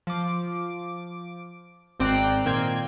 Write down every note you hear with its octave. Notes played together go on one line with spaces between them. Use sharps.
F3 D6
G#1 C4 D5 G5 A#5 F#6
A#2 D#3 A#3 C4 G5 G#6